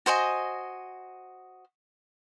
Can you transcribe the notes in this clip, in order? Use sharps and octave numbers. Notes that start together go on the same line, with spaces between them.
F#4 C5 D#5 G#5